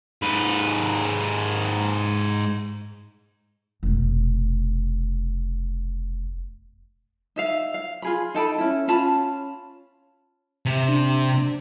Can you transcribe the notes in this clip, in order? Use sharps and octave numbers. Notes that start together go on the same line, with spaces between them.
G#2 B4
F1 B2
D#4 E5 F5
F5
F4 G#4 B5
D#4 A4 G5 B5
C#4 E4
C#4 F4 A5 B5
C3
D4